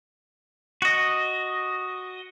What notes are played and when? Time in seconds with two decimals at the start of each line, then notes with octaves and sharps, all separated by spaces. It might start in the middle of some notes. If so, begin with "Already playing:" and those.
0.82 F#4 D#5